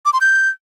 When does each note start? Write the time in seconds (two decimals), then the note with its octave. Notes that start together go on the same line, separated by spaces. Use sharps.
0.05 D6
0.13 C6
0.21 G6